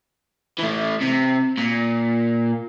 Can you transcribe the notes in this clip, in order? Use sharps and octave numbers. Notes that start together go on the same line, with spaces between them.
E3 A3
C3
A#2